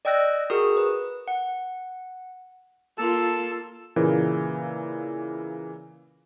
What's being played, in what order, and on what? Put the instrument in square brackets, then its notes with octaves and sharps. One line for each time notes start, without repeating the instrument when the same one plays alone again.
[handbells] D5 D#5 G5 E6 F#6 A#6
F#4 G#4 A#4 D#6
B4
F#5
[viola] A#3 F4 [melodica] A4 A5
[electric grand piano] A#2 C#3 E3 A#3